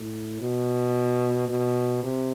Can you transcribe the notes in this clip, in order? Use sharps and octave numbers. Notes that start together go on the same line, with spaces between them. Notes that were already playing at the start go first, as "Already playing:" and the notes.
Already playing: A2
B2
B2
C3